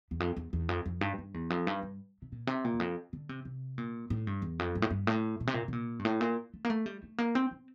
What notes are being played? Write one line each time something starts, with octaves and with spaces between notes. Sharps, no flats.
E2
F2
E2
E2
F2
F2
G2
G2
E2
F2
G2
G2
C3
A#2
C3
A#2
E2
F2
D3
C3
C3
A#2
A2
G2
E2
F2
G2
A2
G2
A2
A#2
C3
A#2
C3
A#2
G2
A2
A#2
A3
A#3
A3
G3
A3
A#3
C4
C4